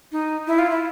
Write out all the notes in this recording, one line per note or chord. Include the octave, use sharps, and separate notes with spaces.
D#4
E4
F4
E4